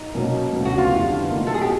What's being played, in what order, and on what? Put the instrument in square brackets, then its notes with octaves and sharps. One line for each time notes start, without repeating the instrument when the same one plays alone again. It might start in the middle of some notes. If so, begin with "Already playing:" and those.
Already playing: [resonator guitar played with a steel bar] D#4
[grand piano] B2 F#3 A#3 C#4
D2 C#3 F#3 B3
[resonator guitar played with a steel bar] F#4
F4
[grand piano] F2 D3 G3 B3 E4
A2 F#3 A#3 D#4
[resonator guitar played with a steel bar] A4
G#4
G4